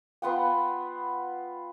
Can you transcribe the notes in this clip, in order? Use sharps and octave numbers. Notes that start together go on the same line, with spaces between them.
B3 F4 F#5 G5